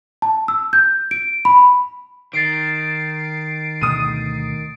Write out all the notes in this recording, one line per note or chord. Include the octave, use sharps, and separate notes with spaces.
A5
E6
G6
D7
B5
D#3 A6 C7 D7
D2 B2 A3 D#6 D#7